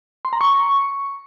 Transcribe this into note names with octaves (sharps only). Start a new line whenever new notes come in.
C6
A#5
C#6